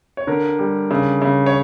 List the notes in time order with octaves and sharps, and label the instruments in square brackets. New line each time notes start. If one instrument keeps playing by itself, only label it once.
[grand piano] C#5
D3 A#4
G3
C#3
C#3
C#5